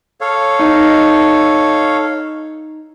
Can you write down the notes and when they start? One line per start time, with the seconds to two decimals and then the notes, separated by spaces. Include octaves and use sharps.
0.21 A4 C#5 F5
0.59 D#4